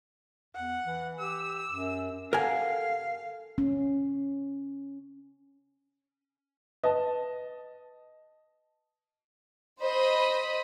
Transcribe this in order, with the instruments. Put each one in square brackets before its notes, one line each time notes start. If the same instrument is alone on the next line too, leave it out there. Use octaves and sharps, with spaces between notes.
[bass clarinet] E2 [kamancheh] F#5
[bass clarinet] E3
[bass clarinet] G4 [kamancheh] E6
[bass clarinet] F#2
[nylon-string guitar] G4 A4 F#5 [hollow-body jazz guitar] A#4 G#5 [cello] F5
[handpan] C#4
[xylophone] B4 [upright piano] D#5 A5
[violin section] C5 D#5 B5 D#6